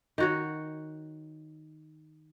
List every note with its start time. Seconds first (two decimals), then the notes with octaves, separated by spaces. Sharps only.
0.18 D#3 F#4 C#5